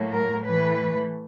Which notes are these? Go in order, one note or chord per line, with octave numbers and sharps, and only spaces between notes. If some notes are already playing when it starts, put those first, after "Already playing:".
Already playing: A2 F#3 A#3
A#4
A2 E3 A3 B4